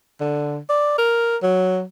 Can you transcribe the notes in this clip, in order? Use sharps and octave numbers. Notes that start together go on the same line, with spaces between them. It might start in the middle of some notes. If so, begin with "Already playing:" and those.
D3
D5
A#4
F#3